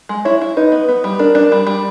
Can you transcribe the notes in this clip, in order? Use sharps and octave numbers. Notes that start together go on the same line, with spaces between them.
G#3
E4 C#5
E4
D#4 B4
B3
B3
G3
D4 A#4
D4
G3
G3